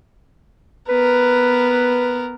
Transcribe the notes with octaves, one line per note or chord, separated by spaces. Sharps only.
B3 A#4 B4